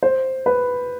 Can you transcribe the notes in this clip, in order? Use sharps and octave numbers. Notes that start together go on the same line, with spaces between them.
C5
B4